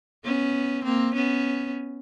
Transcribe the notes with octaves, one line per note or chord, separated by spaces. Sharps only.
B3 C#4
A#3 C4
B3 C#4